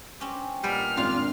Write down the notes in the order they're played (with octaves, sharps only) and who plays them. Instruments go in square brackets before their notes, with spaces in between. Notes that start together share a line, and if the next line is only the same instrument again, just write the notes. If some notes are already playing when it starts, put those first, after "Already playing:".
[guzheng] C4 C#4 G4
[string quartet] A#2 F6 [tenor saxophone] G3 [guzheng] G#3 B3 B4
[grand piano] G#1 [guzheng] C#3 D4 [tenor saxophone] F4